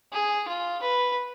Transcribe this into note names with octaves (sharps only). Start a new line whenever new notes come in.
G#4
F4
B4